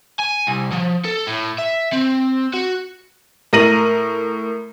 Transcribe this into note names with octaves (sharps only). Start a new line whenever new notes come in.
G#5
C2
F3
A4
A2
E5
C4
F#4
A2 A#4 A#6 D#7 F#7